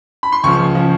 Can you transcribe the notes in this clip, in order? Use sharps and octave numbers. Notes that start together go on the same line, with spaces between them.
B5
C6
C#2 C#3 F3 C#6
C#3 F3